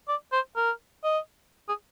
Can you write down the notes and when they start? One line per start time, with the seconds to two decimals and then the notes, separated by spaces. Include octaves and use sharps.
0.08 D5
0.32 C5
0.56 A#4
1.04 D#5
1.69 G#4